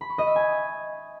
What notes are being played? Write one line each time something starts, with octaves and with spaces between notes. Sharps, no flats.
B5
C#6
D#5
E5
G#5